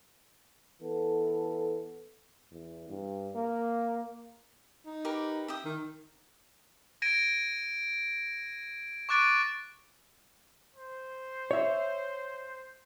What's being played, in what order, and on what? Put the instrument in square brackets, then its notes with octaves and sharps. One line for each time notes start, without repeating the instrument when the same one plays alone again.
[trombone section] E3 B3 A4
[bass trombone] E2
G2
A#3
[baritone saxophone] D#4
[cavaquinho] G4 A#4 B4
E5 G5 D#6
[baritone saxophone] D#3
[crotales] G#6 A#6 D7 D#7
C#6 D6 F#6 A6 D7
[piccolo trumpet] C5
[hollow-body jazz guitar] C#5 E5